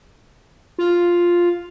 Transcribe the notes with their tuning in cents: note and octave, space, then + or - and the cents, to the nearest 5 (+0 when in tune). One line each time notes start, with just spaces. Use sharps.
F4 +0